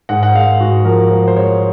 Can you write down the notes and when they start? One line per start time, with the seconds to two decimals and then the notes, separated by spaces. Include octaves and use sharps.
0.09 G#2 F#5
0.23 F#5
0.35 G#3 F5
0.60 G#2 F#4
0.85 F3 A#4
1.11 F3 C5
1.28 C5
1.36 G#3 C#5